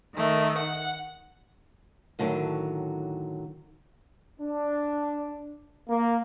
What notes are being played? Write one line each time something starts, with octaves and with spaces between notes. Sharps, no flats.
D#3 A3
F#5
A2 D3 D#3 F#3
D4
A#3